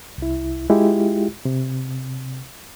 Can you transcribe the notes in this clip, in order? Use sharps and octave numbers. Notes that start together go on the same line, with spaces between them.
C2 E4
G#3 E4 F4 G4
C3